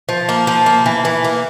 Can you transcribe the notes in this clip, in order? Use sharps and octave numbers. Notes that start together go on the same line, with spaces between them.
F3
A#3
F3
A#3
E3
E3
A#3